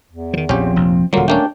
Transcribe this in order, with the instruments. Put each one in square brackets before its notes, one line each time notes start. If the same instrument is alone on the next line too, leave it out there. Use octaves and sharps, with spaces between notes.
[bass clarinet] E2
[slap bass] D#3 F3
[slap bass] A#1 [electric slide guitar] F3 C4 [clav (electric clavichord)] C#4 G4
[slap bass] F1 A#1
[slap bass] D#1 G3 [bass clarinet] D3 [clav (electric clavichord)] F#3 A#3 [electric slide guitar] F4
[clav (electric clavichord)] A3 A#3 C#4 [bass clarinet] D4 [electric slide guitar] G5